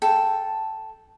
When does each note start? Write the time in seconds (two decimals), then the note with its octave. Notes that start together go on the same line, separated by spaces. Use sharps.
0.02 A4 G5